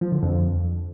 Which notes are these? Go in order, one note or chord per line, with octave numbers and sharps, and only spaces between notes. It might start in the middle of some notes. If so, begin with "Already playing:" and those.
F3
D3
F2